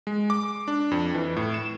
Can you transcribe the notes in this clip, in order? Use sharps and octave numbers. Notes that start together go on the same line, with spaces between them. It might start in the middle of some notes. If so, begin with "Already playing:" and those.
G#3
D6
D4
F2
E3
A2
E7